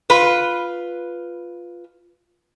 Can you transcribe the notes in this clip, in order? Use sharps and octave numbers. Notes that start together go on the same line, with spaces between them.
F4 B4